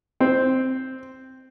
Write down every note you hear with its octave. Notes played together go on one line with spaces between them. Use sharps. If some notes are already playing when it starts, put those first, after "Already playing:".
C4